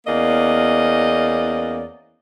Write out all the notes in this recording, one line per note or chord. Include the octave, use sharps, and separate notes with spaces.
E2 A#3 C#4 D5 D#5